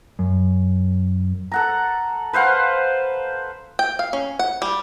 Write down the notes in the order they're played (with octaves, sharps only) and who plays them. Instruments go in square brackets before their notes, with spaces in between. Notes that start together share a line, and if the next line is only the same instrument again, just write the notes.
[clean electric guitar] F#2
[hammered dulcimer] A4 F#5 A#5
B4 C5 F5 F#5
[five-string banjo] G5
F5
C#4
F#5
G3